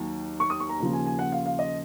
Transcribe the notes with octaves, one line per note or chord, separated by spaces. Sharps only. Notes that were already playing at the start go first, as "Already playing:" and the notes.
Already playing: D#2 D#3 F#3
C#6
D#6
C#6
A#5
D#2 C#3 F3 A#5
G#5
G#5
F#5
F5
F5
D#5